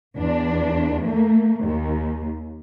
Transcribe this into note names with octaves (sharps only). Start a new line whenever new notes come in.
E2 D4
A3 A#3
D#2